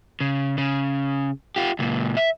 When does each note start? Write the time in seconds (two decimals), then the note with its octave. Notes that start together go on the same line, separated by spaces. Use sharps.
0.21 C#3
0.58 C#3
1.56 F4 G4
1.79 C#2 A#2
2.17 E5